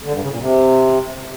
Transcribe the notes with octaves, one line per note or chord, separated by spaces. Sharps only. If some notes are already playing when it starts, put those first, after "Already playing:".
D3
G2
C#3
A#2
C3